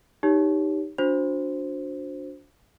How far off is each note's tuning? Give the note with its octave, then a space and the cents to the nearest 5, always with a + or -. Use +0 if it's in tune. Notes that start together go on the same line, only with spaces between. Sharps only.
D#4 +0 G4 +0 C#5 +15
D4 -20 F#4 -40 C5 +0